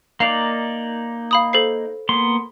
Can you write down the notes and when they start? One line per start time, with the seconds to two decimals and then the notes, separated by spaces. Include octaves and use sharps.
0.20 A#3 D#4 D5 F5 C7 F7
1.31 F5 B5 D#6
1.53 A4 C5 C7
2.09 A#3 B3 C6